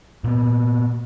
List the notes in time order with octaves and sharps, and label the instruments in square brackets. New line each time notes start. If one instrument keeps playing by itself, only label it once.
[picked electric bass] A#2 B3